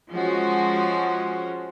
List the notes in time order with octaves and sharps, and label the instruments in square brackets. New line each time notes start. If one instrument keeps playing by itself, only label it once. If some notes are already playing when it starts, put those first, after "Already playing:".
[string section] F3 G#3 C#4 F#4